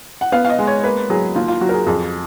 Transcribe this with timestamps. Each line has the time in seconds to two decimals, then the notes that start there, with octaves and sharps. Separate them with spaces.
0.21 F#5
0.32 B3 F5
0.45 F5
0.50 D#5
0.59 G#3
0.67 C#5
0.84 A#3 B4
1.10 F#3 G#4
1.35 D#2 F4
1.48 F4
1.61 F#3 F#4
1.69 A#4
1.74 G#4
1.87 F2 G#4